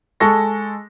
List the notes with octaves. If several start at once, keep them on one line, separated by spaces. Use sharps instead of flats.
G#3 A4 C#6 A#6